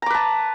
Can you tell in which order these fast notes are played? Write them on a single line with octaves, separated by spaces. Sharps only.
A#5 D6 B4 A5